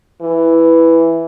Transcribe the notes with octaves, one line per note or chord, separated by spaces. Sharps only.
E3